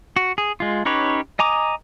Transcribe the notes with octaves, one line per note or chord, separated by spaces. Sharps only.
F#4
G#4
G#3 F4
C#4 D#4 G4 B4 C#5
D#5 G#5 A#5 D6 D#6